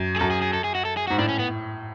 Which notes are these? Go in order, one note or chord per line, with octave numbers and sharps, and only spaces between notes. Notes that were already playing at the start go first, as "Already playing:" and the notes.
Already playing: F#2
G#4
F#2 A4
G#4
G#4
A4
G#4
F#4
A4
G#4
F#4
G#2
A2 D4
C#4
B3